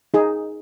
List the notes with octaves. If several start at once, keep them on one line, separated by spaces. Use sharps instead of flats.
D#4 G#4